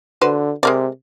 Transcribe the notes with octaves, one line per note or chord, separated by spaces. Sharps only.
D3 F#4 B4 C5
C3 G#3 A#4 D5